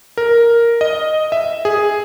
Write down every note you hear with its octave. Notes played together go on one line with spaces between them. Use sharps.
A#4
D#5
E5
G#4